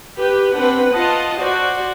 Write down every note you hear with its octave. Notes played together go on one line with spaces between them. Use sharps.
G4 B4
C4 D4 B4 F#5
F4 D#5 F#5 A5
F#4 C5 D5